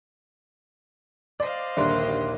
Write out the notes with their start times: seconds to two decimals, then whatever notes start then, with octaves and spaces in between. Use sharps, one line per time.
1.40 C5 D5 D#5 F5
1.77 A#1 D#2 D3 G3 A#3 E5 C6 F#6